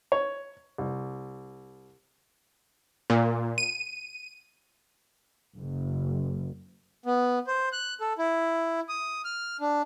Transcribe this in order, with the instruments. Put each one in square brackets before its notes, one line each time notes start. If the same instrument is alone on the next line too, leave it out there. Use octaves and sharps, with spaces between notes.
[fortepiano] C#5
C2
[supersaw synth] A#2
D#7
[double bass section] F#1
[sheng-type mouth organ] B3
C5
F#6
A4
E4
D#6
F6
D4